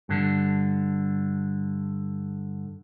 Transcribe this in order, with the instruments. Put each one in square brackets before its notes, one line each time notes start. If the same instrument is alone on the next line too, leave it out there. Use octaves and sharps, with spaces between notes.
[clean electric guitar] G2 D3